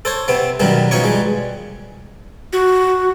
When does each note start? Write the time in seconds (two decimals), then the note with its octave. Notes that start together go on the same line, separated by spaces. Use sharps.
0.05 A4 C5 C#5
0.28 C3 B3 C4
0.60 F#2 B2 D#3 F#3 G3
0.91 B2 F3 D#4 C#5 C#6
1.04 G3 G#3
2.53 F#4